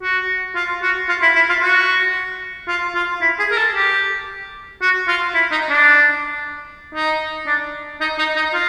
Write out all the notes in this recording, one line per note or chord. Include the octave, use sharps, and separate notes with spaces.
F#4
F4
F#4
F4
E4
E4
F4
F#4
F4
F4
E4
G#4
A#4
A4
G4
F#4
F4
E4
D#4
D4
D#4
D4
D#4
D#4
D#4
F4